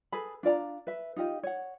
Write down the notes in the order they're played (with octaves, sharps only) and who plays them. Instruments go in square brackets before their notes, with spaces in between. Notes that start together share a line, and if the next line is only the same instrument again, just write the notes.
[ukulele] G#4 A4 B4 B5
D4 F4 D5 A#5
B4 E5
D#4 F4 G4 D#5
C#5 F#5